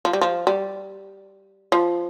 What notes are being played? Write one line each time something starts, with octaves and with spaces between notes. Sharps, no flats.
F3
G3
F3
G3
F3